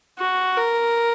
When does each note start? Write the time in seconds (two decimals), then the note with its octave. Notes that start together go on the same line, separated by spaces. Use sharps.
0.19 F#4
0.57 A#4